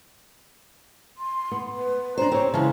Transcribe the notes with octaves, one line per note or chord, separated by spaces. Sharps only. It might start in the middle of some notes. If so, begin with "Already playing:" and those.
C6
B3
B4
C#4 D4 C5 A#5
C4 G4 C#5
C#3 E3 G#3 A5